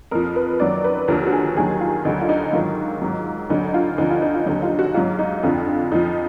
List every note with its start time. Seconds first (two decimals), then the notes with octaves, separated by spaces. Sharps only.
0.11 F2 F3 A#4
0.36 B4
0.60 F#2 D#3 F#3 D5
0.84 B4
1.08 D#2 D3 F3 A#4
1.26 F#4
1.32 G#4
1.57 D#2 D#3 F#3 G#4
1.81 F4
2.05 D2 D3 F#3 D#4
2.21 F4
2.29 D#4
2.53 G#2 D#3 F#3 F4
3.02 G#2 F#3
3.50 D2 D3 F#3 D#4
3.74 F4
3.98 D2 D3 F3 D#4
4.11 F4
4.22 D#4
4.34 F4
4.46 D#2 D3 F#3 D#4
4.62 F4
4.79 F#4
4.94 G#2 F#3 F4
5.19 D#4
5.43 F2 D3 F3 F4
5.91 F2 F3 D#4